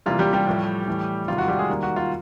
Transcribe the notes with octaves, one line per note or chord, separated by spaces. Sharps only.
C3 E3 G3 A#3 F4
G3 G4
G3 G4
A2 F3 A3
A2 E3 A3
C3 D#3 G3 F4
F#4
G3 G4
G#3 G#4
D#3 G3 A#3
F#4
F4